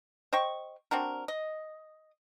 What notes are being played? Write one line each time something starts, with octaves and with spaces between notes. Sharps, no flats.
C5 D#5 G5 C#6
C4 D4 F#4 A#4
D#5